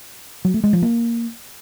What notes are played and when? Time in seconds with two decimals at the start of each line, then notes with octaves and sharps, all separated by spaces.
0.45 F#3
0.54 A3
0.64 G#3
0.73 F3
0.82 A#3